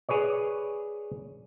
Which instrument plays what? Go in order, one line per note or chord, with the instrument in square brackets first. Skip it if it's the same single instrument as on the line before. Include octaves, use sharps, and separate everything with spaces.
[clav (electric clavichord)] G#4 B4 C#5 D5